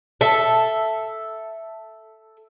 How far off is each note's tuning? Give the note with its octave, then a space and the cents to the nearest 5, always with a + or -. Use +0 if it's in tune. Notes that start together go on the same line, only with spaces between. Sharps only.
A4 +0 E5 +0